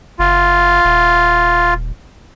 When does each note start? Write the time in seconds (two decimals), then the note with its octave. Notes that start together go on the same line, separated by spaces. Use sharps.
0.19 F#1 F4
0.84 D#1